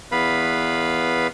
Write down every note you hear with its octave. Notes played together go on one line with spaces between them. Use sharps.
E2 B3 B4 F5 B5